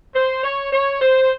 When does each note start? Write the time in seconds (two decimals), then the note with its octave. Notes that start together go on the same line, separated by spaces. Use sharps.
0.15 C5
0.43 C#5
0.72 C#5
1.01 C5